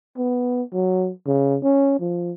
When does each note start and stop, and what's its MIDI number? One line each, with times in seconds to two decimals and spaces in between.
0.17 0.63 59
0.73 1.11 54
1.26 1.58 49
1.63 2.00 61
2.00 2.32 53